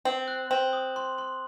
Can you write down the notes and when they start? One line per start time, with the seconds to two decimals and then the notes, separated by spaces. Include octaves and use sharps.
0.05 C4 F#7
0.28 F#6
0.51 C4 F#7
0.73 D#6
0.96 C6
1.18 C6